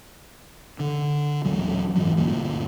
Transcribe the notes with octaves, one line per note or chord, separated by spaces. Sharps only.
D3
D#1 A1 F#3 G3
F#1 G#2 E3 F#3
D2 G2 A#2